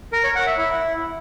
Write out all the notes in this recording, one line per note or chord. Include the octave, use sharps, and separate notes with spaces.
A#4
C#5
F#5
E5
E4